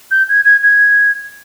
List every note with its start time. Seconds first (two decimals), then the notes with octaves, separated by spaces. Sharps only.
0.11 G6
0.29 G#6
0.45 G#6
0.63 G#6